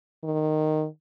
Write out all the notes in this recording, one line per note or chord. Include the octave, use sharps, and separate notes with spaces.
D#3